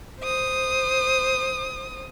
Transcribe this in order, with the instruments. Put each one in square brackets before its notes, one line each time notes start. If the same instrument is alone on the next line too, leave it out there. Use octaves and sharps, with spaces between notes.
[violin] C5 D#6